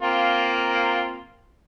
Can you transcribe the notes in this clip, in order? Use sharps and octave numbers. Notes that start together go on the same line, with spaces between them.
A#3 C4 F4